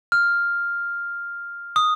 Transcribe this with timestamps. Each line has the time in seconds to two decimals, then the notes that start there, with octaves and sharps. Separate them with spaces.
0.12 F6
1.76 D#6